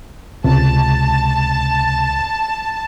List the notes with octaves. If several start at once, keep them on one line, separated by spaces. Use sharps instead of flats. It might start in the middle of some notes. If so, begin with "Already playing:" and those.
C#2 C3 A5